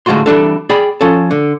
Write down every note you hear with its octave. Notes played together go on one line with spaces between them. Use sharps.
A2 D3 G#3 F4 F#4 C6
E3 G3 D4 A4
G#4 D5 G5 B5
F3 C#4 A4
D3